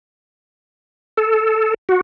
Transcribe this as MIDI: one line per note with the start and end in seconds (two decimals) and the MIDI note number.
1.17 1.74 69
1.89 2.01 66